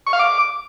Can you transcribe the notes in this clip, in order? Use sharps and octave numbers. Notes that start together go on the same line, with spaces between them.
C#6
F5
D6